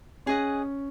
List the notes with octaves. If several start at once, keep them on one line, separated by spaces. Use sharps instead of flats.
C#4 G#4 D#5 F#5